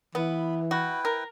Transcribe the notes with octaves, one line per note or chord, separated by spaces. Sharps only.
E3 B3 B5
E4 F#4 B4 G5
A#4